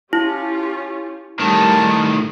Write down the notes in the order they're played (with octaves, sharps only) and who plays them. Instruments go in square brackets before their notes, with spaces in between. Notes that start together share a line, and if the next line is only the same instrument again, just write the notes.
[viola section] C#4 F4 G4 [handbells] E4
[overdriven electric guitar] A2 D#3 [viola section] G3 [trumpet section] A5